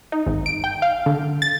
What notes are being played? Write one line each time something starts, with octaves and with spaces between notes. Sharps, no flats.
D#4
G#1
D7
G5
F5
D3
A6